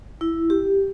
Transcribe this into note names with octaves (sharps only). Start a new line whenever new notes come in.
E4
G4